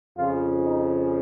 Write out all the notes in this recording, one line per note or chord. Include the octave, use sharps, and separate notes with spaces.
F2 C#3 F3 F4
D#4